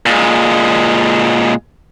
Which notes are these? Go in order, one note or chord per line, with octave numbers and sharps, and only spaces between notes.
A#2 G#3